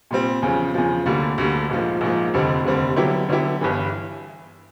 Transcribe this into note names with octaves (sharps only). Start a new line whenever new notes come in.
A#2 G3 C4
E2 C#3 F3
E2 C#3 F3
D2 D3 G3 A#3
D2 D3 G3 A#3
A#1 G#2 F3 A#3
A#1 G#2 F3 A#3
F1 D#2 D3 G3 C4
F1 D#2 D3 G3 C4
D3 F#3 B3 E4 G4
D3 F#3 B3 E4 G4
G1 G2 E3